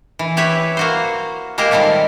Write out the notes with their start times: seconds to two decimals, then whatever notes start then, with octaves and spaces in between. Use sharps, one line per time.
0.19 E3
0.37 E4 G4 B4 C#5 E5
0.77 A#3 F#4 C5
1.58 G#3 A#3 F4 G4 A#4 C5
1.71 D#3 G3 C4 A4 E5